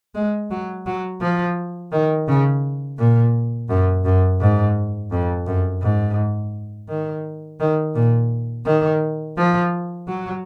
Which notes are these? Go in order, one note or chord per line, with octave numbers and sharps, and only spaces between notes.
G#3
F#3
F#3
F3
D#3
C#3
A#2
F#2
F#2
G#2
F2
F#2
G#2
D#3
D#3
A#2
D#3
F3
F#3